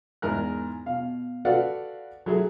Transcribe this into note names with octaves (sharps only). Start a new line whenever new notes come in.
E2 G#2 A#4 F#6
B2 F5
F#4 A4 B4 D5 F5 F#5
F#3 A3 E4 G#4